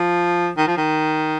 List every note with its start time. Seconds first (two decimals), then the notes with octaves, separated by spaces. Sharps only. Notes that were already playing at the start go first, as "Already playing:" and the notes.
Already playing: F3
0.57 D#3
0.67 F3
0.77 D#3